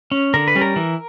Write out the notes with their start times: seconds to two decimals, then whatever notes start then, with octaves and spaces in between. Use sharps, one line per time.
0.12 C#4
0.34 D3 A#4
0.48 B4
0.55 G3 C#4
0.61 A#4
0.76 E3